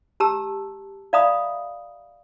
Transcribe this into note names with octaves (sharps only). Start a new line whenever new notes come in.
G4 A5 A#5 E6
D5 E5 F5 A#5 B5 D#6